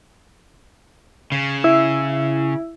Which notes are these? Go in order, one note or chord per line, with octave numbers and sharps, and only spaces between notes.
C#3
E4